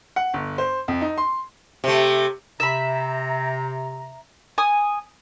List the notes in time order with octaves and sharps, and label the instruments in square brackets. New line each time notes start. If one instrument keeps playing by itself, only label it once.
[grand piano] F#5
G1
C5
F2
D#4
C6
[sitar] C3 A3
[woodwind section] C3 A#5 [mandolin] E5 B5
[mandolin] G#5 D#6